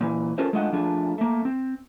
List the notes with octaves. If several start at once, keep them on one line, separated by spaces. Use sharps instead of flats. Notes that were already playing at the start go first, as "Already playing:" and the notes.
A#2 E3
C#4 F4 A4 A#4 C5
G#3 A3 D4 F4 D#5 F#5
F3 A3 D4 F4 G#4
A3 A#3
C4